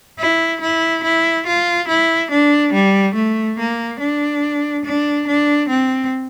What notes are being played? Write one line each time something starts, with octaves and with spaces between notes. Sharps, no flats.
E4
E4
E4
F4
E4
D4
G3
A3
A#3
D4
D4
D4
C4